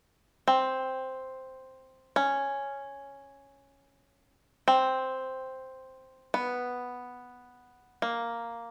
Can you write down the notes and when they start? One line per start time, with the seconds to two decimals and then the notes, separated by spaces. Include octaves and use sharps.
0.48 C4
2.16 C#4
4.68 C4
6.34 B3
8.02 A#3